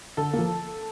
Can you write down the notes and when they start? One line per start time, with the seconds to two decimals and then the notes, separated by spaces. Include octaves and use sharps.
0.17 D3 A4
0.33 F3 A#3